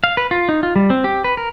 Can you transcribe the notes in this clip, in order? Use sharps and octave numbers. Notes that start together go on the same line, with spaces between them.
F5
B4
F4
D#4
F4
G3
C4
G4
B4
A#4